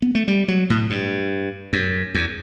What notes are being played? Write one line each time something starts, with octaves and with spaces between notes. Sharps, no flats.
B3
A3
G3
F#3
A2
G2
F#2
E2